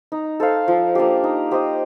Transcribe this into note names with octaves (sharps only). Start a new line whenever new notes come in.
D#4
A4 C5 F5
F3
A#3 D4 G4
D#4
G4 C5 D#5